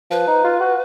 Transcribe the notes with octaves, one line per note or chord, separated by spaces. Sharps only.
F3 B4
D#4
F4
F#4